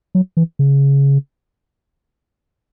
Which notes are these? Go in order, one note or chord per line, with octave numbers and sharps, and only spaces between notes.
F#3
E3
C#3